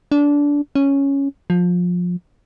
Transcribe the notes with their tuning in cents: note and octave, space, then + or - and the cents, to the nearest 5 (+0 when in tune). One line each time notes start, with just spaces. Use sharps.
D4 -20
C#4 +0
F3 +25